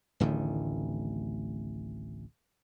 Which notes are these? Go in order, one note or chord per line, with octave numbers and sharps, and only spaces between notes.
D1 A1 D3 D#3